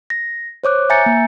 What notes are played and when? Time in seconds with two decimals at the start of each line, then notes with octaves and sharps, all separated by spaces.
0.10 A#6
0.64 C5 C#5 D6 F#6
0.90 E5 G#5 A#5 G6 A6 C#7
1.06 A#3